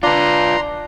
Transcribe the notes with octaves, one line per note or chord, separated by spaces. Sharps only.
D4 F4 B4 A#5 C6